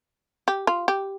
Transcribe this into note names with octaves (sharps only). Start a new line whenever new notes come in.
G4
F4
G4